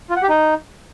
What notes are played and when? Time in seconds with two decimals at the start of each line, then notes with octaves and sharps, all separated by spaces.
0.10 F4
0.16 F#5
0.23 G4
0.29 D#4